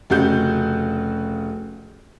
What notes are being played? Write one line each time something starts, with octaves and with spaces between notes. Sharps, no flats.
F1 C#3 F#4 G6